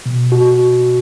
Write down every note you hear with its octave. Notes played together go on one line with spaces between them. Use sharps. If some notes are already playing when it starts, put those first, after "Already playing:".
B2
F#4